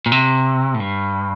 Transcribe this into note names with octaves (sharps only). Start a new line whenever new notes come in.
A#2
C3
A2
G2